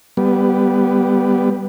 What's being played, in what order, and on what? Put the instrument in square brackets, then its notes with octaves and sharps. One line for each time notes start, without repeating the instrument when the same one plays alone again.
[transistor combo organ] G3 B3